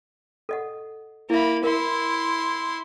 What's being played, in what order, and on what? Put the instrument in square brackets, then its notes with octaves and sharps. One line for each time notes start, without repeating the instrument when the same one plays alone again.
[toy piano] A4 D#5 F#5
[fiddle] A#3 B5 [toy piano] E4 E5
[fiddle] E4 C6 [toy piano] A#4